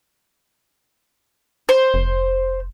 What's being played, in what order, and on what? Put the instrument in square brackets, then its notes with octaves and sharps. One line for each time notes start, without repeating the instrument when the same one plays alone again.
[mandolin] C5
[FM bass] F1